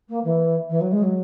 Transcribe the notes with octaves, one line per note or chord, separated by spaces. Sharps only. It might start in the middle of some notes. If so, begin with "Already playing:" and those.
A#3
E3
E3
F#3
G#3
F#3